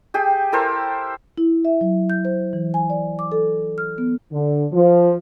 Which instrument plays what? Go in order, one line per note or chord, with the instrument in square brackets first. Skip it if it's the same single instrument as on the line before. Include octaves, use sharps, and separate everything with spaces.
[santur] G4 G#4 G5
E4 A4 A#4 C5
[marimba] E4
E5
F#3
G6
C5
E3
G#5
D5
D6
A4
F6
B3
[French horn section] D3
F3